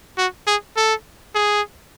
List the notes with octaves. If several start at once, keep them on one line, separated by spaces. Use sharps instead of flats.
F#4
G#4
A4
G#4